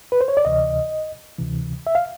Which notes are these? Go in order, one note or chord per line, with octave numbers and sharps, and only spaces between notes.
B4
C5
C#5
D5
D2 C3 E3 D#5
D2 C3 E3
E5
F5